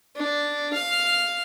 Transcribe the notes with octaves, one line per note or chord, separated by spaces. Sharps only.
D4
F5